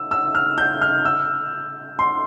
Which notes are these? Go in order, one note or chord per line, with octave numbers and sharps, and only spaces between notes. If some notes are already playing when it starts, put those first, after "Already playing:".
Already playing: E6
E6
F6
G6
F6
E6
C6